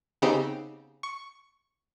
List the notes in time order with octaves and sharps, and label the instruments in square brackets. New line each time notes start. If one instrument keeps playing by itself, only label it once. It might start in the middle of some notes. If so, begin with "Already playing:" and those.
[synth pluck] C#3 B3 C4 D#4 G4
C#6